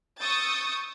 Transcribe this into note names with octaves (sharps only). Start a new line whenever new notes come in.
C#6 D#6 E6 G6 A6